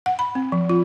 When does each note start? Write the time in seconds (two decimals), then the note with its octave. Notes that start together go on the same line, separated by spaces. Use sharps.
0.06 F#5
0.19 B5
0.35 C4
0.52 F3
0.69 F4